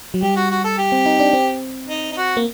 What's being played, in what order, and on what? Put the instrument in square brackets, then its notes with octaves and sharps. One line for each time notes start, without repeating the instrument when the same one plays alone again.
[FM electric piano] F#3
[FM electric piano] G3 [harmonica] G4
[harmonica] F#4
F#4
A4
G4
[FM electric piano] C4
D#4
D4
C4
[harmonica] D#4
D#4
F#4
[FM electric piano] A#3